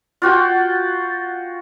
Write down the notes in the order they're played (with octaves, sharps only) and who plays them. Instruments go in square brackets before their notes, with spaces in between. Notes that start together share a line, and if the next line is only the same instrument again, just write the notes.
[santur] F4 F#4 G5